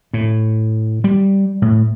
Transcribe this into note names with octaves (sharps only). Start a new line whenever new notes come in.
A2
G3
A2